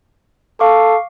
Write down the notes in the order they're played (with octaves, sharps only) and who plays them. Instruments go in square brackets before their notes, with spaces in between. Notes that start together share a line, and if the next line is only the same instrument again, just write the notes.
[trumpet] A4 [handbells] F5 C#6 D6